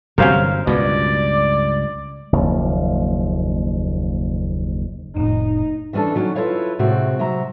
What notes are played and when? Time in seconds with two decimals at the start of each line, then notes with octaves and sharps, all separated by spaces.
0.18 G1 C3 F#3 C#4 A#4 C5 F5
0.67 C#2 G2 B2 D5
2.32 F#1 D#2 F3
5.16 F1 A2 D#4
5.93 E3 B3 C#4 D4 A4
6.15 D#3 F#3 C#4
6.35 E4 F4 A4 B4 C#5 F5
6.79 A2 C3 G#3 C4 F#4
7.19 C3 F#3 E5 A#5